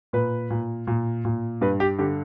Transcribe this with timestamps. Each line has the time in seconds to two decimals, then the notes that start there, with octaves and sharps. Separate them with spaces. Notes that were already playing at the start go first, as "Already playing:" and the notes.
0.13 A#2 B4
0.50 A#2
0.87 A#2
1.25 A#2
1.61 G2 B4
1.80 G4
1.99 D3 G4